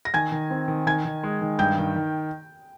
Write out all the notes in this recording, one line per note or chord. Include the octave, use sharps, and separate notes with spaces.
A#6
D#3 G#5 G#6
D#3
C4
D#3
D#3 G#5 G#6
D#3
G#3
D#3
G2 G5 G6
D#3
D#3